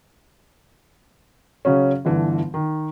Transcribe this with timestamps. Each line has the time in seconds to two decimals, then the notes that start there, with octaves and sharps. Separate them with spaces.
1.65 C#3 F#3 C#4
2.05 G1 D3 E3
2.54 D#3